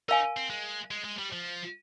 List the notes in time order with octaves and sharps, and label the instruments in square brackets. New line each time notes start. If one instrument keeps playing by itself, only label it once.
[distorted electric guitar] D#4 [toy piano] A#4 F5 G#5
[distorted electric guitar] C4
G#3
G#3
G#3
G3
F3